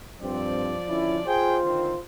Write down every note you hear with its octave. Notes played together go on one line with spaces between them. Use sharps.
G2 F3 C4 D5
D3 C#4 E4
F4 G#4 C5 G5
D3 D#3 C4